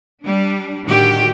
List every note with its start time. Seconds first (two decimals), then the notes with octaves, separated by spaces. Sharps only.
0.22 G3 D4
0.85 A2 D3 D#3 G3 F#4 G4